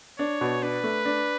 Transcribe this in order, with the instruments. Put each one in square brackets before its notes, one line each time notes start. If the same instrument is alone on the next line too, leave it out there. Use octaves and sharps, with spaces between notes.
[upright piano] D4 [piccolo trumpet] C#5
[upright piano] B2
[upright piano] D4 [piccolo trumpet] B4
[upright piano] A3
D4